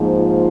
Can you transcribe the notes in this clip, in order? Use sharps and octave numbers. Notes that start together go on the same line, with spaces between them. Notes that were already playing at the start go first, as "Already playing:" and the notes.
Already playing: G#2 F3 A#3
F4